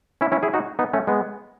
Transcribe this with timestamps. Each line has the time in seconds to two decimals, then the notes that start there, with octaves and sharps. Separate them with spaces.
0.21 C#4 E4
0.32 C#4 E4
0.43 E4 G#4
0.54 D#4 F#4
0.79 B3 D#4
0.93 A3 C#4
1.07 G#3 B3